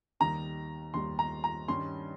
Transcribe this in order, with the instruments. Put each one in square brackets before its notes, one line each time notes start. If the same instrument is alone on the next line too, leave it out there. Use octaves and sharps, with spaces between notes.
[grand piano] D#2 D#3 G3 [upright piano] A#5
[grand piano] D#2 D#3 G3 [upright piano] C6
[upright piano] A#5
A#5
[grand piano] G2 D#3 G3 C#4 [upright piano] C6